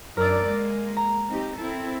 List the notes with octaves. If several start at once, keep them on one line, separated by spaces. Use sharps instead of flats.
F#2 D4 A#4 D5 E6
G#3 A#3
A#5
C4 D#4 G4
C4 E4 A4